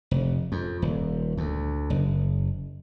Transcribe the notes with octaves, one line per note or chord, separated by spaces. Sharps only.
F1
F2
D#1
D2
F#1